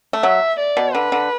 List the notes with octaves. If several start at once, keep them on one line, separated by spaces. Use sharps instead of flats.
A3
F#3 E5
D5
B2
D3 B4
D3